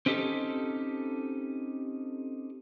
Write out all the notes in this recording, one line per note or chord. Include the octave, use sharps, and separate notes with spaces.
C4 C#4 D#4 G4 A4